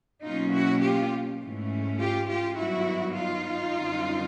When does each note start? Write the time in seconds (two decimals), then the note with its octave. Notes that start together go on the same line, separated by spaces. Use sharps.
0.25 B2 F#3 A#3 C#4 D#4 F4
0.54 E4 F#4
0.83 F4 G4
1.41 G#2 E3 A3 C#4
1.99 F4 G4
2.28 F4 G4
2.57 G2 D#3 F#3 B3 E4 F#4
3.16 D#4 F4
3.74 F#2 D3 G3 C4